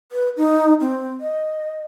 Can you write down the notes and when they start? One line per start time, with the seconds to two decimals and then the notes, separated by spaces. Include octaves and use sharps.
0.12 B4
0.37 D#4
0.81 C4
1.21 D#5